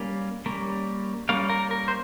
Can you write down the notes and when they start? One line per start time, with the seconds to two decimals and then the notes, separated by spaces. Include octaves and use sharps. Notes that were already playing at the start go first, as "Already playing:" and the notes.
Already playing: G3 A#3 C#4
0.46 G3 A#3 C#4
1.29 G3 A#3 C#4 F5
1.49 A#4
1.71 A#4
1.88 C5